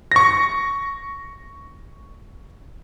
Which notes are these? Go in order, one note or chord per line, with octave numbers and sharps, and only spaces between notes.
C#6 A#6